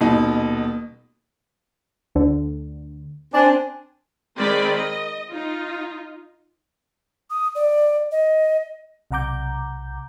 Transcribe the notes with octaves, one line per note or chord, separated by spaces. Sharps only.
D#1 B2 D#4
D2 D3
C4 D4 G#5
D#3 G#3 C4 A#4 D5 B5
D#5
D#4 F4
D#6
D5
D#5
B1 C3 F#5 A#5 D6 G6